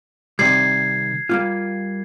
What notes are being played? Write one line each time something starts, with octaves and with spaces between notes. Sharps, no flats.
C3 D#3 G3 G#6 C7
G3 A#3 F4